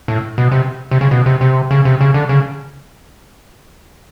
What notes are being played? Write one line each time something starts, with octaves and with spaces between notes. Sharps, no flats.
A2
B2
C3
C3
C#3
B2
C3
C3
C#3
C3
C#3
D3
C#3